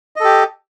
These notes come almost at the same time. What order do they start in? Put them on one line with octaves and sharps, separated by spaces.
D#5 A4 G4